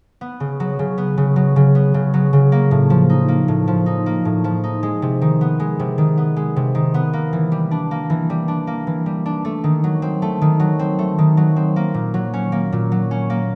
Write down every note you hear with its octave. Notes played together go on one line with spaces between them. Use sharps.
B3
C#3
F#3
C#3
B3
C#3
F#3
C#3
B3
C#3
F#3
C#3
A#3
A2
F3
D#4
A#3
A2
F3
D#4
A#3
A2
F3
D#4
G#3
C3
D#3
B3
G#3
C3
D#3
B3
G#3
C3
D#3
B3
A#3
E3
G3
D4
A#3
E3
G3
D4
A#3
E3
G3
D4
A3
D#3
F#3
C4
A3
D#3
F#3
C4
A3
D#3
F#3
C4
A#3
A#2
F#3
C#4
A#3
A#2
F#3
C#4
A#3